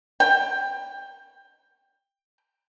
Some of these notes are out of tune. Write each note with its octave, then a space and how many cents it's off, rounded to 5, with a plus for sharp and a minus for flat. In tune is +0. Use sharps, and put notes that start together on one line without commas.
G5 +15